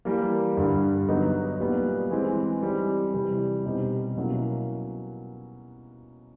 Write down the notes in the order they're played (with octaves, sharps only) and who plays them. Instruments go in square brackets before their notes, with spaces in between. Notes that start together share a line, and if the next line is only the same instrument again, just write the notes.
[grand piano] E3 G3 A#3
G2 D3 G3
D3 F#3 B3 D#4
A#2 G3 B3 D#4
E3 G#3 C4
E3 G3 C4 D#4 G4
C3 E3 G3
B2 G3 C4 D#4 G4
B2 F#3 A#3 C#4 E4